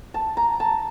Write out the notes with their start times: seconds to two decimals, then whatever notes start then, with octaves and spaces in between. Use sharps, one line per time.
0.14 A5
0.37 A#5
0.60 A5